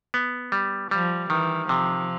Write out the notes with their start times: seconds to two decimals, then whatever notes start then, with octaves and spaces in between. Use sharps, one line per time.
0.14 B3
0.52 G3
0.91 F3 G3
1.30 D#3 E3
1.69 C3 F3